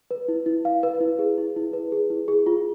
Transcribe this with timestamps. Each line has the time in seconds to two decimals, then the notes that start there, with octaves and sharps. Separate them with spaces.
0.11 B4
0.28 E4
0.46 E4
0.65 F5
0.83 B4
1.01 E4
1.19 G#4
1.38 E4
1.56 E4
1.73 B4
1.92 G#4
2.10 E4
2.28 G#4
2.46 F4